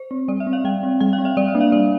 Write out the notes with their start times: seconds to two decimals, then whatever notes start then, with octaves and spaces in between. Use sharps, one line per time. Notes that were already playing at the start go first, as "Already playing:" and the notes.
Already playing: C5
0.11 C4
0.28 G3 D5
0.40 E5
0.47 C4
0.53 F5
0.64 G3 G5
0.83 C4
1.00 G3 G5
1.13 F5
1.18 C4
1.25 E5
1.37 G3 D5
1.48 E5
1.54 A#3 D4
1.61 F5
1.72 G3 D5